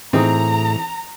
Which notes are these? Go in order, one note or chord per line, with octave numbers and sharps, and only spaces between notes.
A2 E3 C4 D#4 G#4 A#5